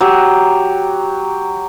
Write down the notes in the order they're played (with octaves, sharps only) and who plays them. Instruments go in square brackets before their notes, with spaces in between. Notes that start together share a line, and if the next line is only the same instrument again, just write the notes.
[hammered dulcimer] F#3 G4